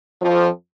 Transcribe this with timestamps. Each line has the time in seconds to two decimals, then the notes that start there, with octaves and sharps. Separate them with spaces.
0.21 F2 F3